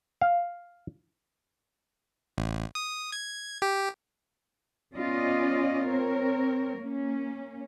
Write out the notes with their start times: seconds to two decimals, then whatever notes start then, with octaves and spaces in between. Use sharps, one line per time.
0.21 F5
2.38 A1
2.75 D#6
3.12 G#6
3.62 G4
4.95 B3 C#4 F4 D5 D#5
5.84 C4 A#4 C#5
6.78 A#3 C#4